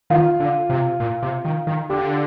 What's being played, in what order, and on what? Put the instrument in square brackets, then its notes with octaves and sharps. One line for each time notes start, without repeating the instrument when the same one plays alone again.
[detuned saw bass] D#3 [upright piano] F4
[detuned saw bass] D3
C3
A#2
C3
D#3
D#3
[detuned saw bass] D3 [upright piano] G4